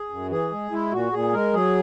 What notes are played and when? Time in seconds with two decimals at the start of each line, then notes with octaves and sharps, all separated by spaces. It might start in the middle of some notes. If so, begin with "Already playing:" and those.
Already playing: G#4
0.10 F#2
0.30 E3 G#4
0.52 G#3
0.71 G#3 E4
0.92 A#2 F#4
1.12 A#2 G#4
1.33 G#3 A#4
1.54 F#3 G#4